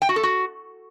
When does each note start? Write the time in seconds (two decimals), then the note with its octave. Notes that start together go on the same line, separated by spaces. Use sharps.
0.02 G5
0.09 F#4
0.16 A4
0.23 F#4